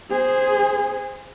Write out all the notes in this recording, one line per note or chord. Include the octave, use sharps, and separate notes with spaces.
G#4 C5